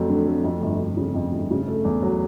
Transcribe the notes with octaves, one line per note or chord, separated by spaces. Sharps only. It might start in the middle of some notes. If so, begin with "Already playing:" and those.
Already playing: F2 F#3 A3
D3
A3
F2
G1
G1
C#3
F2
G1
C#3
A3
E2
F#3